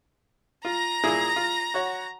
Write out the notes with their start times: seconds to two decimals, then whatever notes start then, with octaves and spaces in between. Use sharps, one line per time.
0.65 F4 A#5 A#6
1.04 A#2 E4 G#4
1.36 F4
1.74 F#4 C#5 F#5